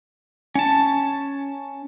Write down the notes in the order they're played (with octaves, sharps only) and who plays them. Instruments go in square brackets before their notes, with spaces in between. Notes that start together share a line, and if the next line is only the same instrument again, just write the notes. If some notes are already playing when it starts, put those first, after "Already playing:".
[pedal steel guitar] C#4 A5